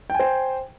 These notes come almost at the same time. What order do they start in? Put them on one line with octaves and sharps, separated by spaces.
G5 G#5 C5